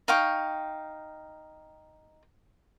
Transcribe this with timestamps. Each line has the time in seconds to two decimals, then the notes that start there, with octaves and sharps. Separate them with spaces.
0.08 D#4 F5 G5 C#6